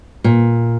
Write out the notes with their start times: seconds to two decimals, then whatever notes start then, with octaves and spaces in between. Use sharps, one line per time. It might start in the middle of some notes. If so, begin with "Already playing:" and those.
0.24 A#2